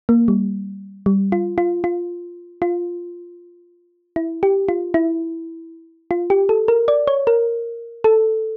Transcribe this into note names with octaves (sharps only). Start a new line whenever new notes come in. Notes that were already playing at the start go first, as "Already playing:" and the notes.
A#3
G3
G3
F4
F4
F4
F4
E4
G4
F4
E4
F4
G4
A4
A#4
D5
C#5
A#4
A4